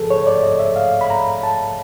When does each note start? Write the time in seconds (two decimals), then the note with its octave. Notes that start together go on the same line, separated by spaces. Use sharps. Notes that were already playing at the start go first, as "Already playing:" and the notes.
Already playing: F2 C#3 F3 G#4 A4
0.10 C#5
0.27 D5
0.43 D#5
0.59 E5
0.76 F5
1.01 B5
1.10 A#5
1.43 A5